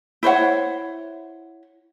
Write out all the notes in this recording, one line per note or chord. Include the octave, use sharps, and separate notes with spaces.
E4 C5 C#5 F#5